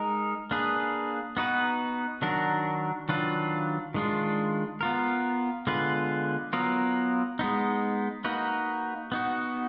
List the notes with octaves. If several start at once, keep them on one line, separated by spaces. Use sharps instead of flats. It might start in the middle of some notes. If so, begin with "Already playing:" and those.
Already playing: G#3 D#4 A#4
A#3 D4 G#4 B4
B3 D#4 F#4 B4
D#3 F#3 D4 F#4 A#4
D#3 F#3 D4 F4 B4
D#3 G#3 D4 F4
B3 F4 A#4
D3 G#3 B3 F4 B4
F#3 B3 F4 A#4
G#3 B3 D#4
A#3 D#4 F#4 B4
B3 D#4 F#4